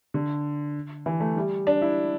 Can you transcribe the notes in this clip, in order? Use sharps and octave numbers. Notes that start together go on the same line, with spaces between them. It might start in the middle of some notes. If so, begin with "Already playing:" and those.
D3
E3
A3
G3
D4
E4